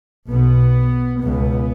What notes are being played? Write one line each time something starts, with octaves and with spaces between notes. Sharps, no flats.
B1 B2 B3
C#2 B2 B3